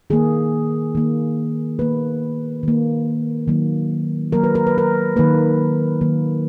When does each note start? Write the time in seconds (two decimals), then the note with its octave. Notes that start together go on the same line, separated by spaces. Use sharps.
0.10 D#3 A#3 G#4
0.95 D#3 A#3
1.79 D#3 A#3 B4
2.63 D#3 A#3
3.48 D#3 F#3 A#3
4.32 D#3 F#3 A#3 A#4
4.44 B4
4.55 A#4
4.67 B4
4.78 A#4
5.16 D#3 F#3 A#3 B4
6.01 D#3 F#3 A#3